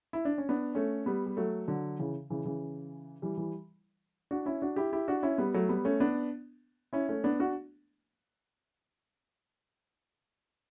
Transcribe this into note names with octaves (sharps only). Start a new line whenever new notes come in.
E4
D4
C#4
B3 D4
A3 C#4
G3 B3
G3
F#3 A3
D3 F#3
C#3 E3
C#3 E3
C#3 E3
E3 G3
E3 G3
D4 F#4
C#4 E4
D4 F#4
E4 G4
E4 G4
D4 F#4
C#4 E4
G3 B3
F#3 A3
G3 B3
A3 C#4
B3 D4
C#4 E4
A3 C#4
B3 D4
D4 F#4